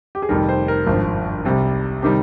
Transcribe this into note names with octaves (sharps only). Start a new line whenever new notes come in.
G4
G#4
F1 F2 D#3 G3 A#4
C5
A#4
G#1 G2 F3
C2 C3 G3
C3 D#3 G3 G4